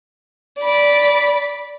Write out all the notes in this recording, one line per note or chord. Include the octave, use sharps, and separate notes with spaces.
D5 B5